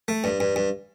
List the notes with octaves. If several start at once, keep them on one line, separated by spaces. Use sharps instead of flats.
A3
G2
G2
G2